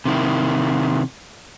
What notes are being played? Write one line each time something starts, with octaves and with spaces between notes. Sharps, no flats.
C3 D#3 E4